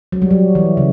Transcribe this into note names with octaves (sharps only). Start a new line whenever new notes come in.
F#3
G3
F#3
E3
C#3